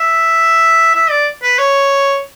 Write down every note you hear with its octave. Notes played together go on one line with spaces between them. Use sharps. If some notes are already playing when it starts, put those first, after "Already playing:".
Already playing: E5
E5
D5
B4
C#5